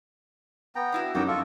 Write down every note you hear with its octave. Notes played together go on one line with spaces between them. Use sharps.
B3 G5 A#5
D4 E4 F#4
F#2 D#4 E4 F#4 G4 G5
F4 A4 F5 C#6